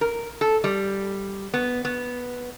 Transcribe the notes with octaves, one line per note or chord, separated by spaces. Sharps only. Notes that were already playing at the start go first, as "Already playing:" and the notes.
A#4
A4
G3
B3
B3